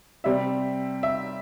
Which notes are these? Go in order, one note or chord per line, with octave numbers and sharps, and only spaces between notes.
C3 G3 C4 E5
E5